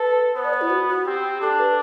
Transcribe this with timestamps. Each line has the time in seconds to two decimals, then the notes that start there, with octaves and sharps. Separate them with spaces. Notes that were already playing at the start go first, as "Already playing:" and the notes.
Already playing: A4 B4
0.35 B3 C5
0.45 D5
0.54 C5
0.61 E4
0.70 F#4
0.89 F#4
1.06 C4 G4
1.41 D4 A4
1.59 B4